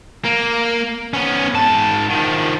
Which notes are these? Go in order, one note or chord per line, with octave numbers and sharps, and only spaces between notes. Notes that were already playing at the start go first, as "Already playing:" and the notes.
A#3
B3 C#4
G#2 A5
D#3 F3